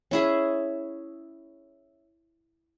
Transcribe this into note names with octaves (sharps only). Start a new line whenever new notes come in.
C#4 E4 G#4